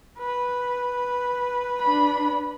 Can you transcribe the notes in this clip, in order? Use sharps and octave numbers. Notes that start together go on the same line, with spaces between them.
B4
D4 B5